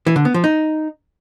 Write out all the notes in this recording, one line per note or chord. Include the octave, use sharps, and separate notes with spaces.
E3
D3
B3
F3
D#4